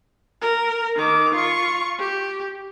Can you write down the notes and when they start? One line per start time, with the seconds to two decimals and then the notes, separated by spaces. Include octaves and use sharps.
0.42 A#4
0.96 D#3 D6
1.35 F4 C#6
1.99 G4